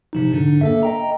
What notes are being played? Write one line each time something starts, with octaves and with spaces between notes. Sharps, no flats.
C3 F3 D#4
G#2 D3 D4
A#3 A4 E5
D#5 G5 A#5